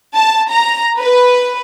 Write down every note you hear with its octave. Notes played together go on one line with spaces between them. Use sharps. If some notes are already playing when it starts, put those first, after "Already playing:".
A5
A#5
B4